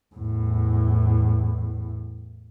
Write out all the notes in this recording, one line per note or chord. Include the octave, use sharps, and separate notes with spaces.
E2 A2